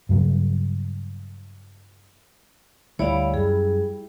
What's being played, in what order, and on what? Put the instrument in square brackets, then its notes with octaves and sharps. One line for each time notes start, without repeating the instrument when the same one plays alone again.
[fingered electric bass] G2 C#3 F#3
[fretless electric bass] D2 [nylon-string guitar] G3 E4 [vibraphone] C#5 D5 F5
[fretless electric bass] F#2 [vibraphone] G#4